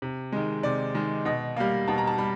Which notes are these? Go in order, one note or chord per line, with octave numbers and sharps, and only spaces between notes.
C3
D#3 G#3
C3 D5
D#3 G#3
B2 D#5
G3 A#3 F5
B2 A5
A#5
A5
G3 B5